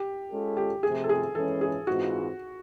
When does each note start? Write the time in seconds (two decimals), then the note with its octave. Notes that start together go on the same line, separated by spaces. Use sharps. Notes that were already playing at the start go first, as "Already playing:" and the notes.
Already playing: G4
0.31 G#3 C#4 F4 A4
0.57 G4
0.83 C3 F3 A3 G#4
1.04 A4
1.09 G#4
1.35 E3 G#3 C#4 A4
1.61 G#4
1.87 G#2 E3 G#3 C4 F4 F#4